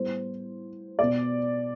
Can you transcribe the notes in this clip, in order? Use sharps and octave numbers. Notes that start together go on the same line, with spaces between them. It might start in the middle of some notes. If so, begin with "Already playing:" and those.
Already playing: A2 G3 B3 C5
B2 B3 D5